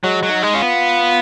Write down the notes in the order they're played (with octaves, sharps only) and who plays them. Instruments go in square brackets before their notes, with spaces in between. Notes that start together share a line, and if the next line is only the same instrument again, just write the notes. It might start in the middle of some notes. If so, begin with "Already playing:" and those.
[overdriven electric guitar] F#3 [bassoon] G#3
[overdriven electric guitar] F#3
[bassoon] D#4
[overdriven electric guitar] G#3
[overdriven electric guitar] C#4 [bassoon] F4
[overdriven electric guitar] B3